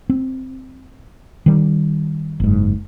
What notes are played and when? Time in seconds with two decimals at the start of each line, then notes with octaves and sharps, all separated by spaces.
0.10 C4
1.46 D#3 G3
2.40 F#1 G#2